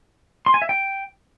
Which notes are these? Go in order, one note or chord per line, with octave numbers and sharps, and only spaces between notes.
C6
G#5
E5
G5